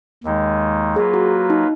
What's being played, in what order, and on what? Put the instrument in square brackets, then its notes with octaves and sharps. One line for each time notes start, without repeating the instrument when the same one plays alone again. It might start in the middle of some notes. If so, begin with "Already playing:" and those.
[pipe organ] D#2 D#3 G#3 D#4
[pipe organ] F#3 A#3 F4 B4 [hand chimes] G#4
[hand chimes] F#4
D#4